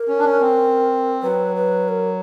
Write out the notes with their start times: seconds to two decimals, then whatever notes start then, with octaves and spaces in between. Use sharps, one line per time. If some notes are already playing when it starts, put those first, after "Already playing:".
Already playing: A#4
0.08 C#4
0.19 D4
0.24 C#4
0.41 C4
1.22 F#3 B4
1.56 B4
1.88 A#4